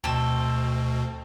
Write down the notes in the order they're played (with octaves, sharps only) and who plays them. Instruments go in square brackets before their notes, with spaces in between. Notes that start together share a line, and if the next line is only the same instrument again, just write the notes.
[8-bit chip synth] D2 B2 [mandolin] C4 A4 E6